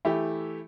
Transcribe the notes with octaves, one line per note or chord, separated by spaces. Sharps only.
E3 A3 E4 G4